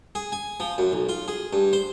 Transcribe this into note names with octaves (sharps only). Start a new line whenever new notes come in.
G#4
G#5
F3
F#2
B1
F4
G#4
G2
C5